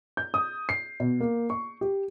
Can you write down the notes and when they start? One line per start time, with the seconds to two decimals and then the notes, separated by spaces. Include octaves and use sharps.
0.17 G6
0.34 D#6
0.69 C7
1.00 B2
1.20 A#3
1.50 C#6
1.81 G4